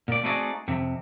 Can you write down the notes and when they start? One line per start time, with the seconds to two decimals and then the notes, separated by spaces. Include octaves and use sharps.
0.08 A#2 D5
0.23 A3 C4 D#4 F#4 G#4 D5
0.68 F2 C3